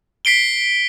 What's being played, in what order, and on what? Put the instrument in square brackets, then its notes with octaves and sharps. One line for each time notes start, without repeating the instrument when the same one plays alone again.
[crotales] B6 C7 D7 G7